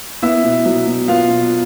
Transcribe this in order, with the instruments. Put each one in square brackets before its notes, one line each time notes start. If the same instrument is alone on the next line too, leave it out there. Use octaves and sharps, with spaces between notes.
[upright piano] B3 [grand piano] E4 E5
[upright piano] B2
F#3
B2
[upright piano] B3 [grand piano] F4 F5
[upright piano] B2